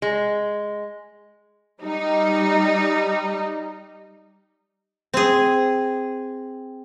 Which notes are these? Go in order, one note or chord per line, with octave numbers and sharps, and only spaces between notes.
G#3
G3 D#4
C4 G#4